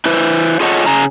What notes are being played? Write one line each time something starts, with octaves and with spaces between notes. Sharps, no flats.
E4 B4 C5
F4 G#4 A4 C#5 D#5 F#5
C#3 G#4 A#5